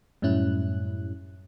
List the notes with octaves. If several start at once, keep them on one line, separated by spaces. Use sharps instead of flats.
F#2 A2 G3 C#4 E4 F#6